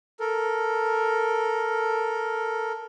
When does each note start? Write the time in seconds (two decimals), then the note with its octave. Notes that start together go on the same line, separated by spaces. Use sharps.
0.20 A4 A#4